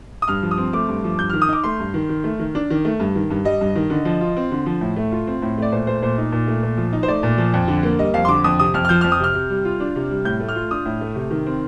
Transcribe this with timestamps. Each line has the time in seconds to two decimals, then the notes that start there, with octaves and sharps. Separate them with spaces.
0.22 D#6
0.28 G2 F6
0.43 F3
0.51 D#6
0.58 C4
0.73 A3 D6
0.89 G2
1.04 F3
1.19 G2 G6
1.30 D#3 F6
1.42 D#6
1.49 D#4 D6
1.64 A3 C6
1.80 G2
1.94 D#3
2.09 D#3
2.24 A3
2.39 D#3
2.55 D4
2.70 D#3
2.85 A3
3.00 G2
3.15 D#3
3.30 G2
3.45 G3 D#5
3.61 G2
3.76 D#3
3.90 D3
4.05 F3
4.21 F4
4.37 C4
4.51 D3
4.66 F3
4.81 A2
4.96 A3
5.12 F4
5.27 C4
5.42 A2
5.57 A3 D5
5.72 A#2 C5
5.87 A3 C5
6.02 A#2 C5
6.18 D#4
6.32 A#2
6.47 A3
6.62 A#2
6.77 F3
6.93 D#4
7.03 C5
7.08 A3 D5
7.23 A#2
7.38 F3
7.54 F2
7.68 D3
7.83 A#3
7.98 G3 D#5
8.14 F2 F5
8.25 C6
8.28 D3 D6
8.44 F2 D#6
8.59 C3 D#6
8.74 F2 F6
8.85 F6
8.89 F3 G6
9.01 F6
9.04 F2
9.12 D#6
9.20 C3 F6
9.35 C3
9.50 G3
9.65 F4
9.80 D4
9.96 C3
10.11 G3
10.25 A2 G6
10.40 A3
10.49 F6
10.56 F4
10.71 D4 D#6
10.86 A2
11.01 A3
11.15 C3
11.31 D#3
11.46 C4